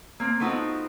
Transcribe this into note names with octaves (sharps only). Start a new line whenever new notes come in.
A#3 C4
A3 B3 C4 D#4 F4 F#4